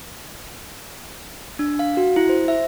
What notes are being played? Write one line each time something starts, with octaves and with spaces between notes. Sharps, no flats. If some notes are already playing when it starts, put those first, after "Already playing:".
D4
F5
F#4
E4
C5
E5